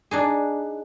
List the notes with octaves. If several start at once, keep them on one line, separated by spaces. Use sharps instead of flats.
D4 D#4 G#4